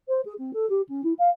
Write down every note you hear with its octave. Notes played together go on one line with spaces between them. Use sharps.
C5
G#4
C4
A4
G4
C#4
E4
F5